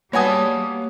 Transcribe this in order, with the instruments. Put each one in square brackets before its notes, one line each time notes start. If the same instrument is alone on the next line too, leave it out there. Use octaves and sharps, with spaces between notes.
[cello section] G3 [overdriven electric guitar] A#3 A5 [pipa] B3 F#4 G#5 [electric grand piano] C#5 D#6